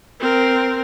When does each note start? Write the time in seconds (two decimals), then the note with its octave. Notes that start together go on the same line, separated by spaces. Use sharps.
0.20 C4 A#4